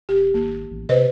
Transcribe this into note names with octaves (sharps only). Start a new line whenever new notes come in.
E1 G4
G#1 A#3
A1
C3 B4 C5 D#5